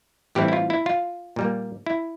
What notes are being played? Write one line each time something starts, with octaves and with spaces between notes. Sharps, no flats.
A2 E3 G3 C4 E4 G4
E4
F4
E4
F4
A#2 G3 A#3
E4